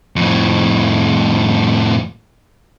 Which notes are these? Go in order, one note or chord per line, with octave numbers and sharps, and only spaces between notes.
F2 A2